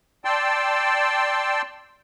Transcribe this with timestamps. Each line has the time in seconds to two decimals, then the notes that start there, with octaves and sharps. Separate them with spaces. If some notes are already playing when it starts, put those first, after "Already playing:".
0.25 D5 G5 A5 C6 E6